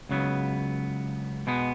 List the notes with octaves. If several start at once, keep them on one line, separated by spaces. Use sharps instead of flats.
C#2 C#3 F#3 B3
B2 G#3 B3